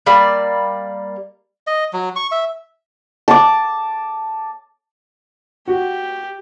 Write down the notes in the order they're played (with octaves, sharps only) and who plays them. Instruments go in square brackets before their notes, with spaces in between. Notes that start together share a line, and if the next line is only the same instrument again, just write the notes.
[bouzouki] G3 A#3 D5
[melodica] D#5
F#3
C#6
E5
[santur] A5 D6
[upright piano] F#4 [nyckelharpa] G4